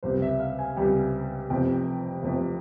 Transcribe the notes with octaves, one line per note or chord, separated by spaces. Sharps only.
C#2 C3 G3 C5
E5
F5
G#5
C#2 C3 G3 G5
F1 F2 C3 E3 G5
F1 F2 C3 E3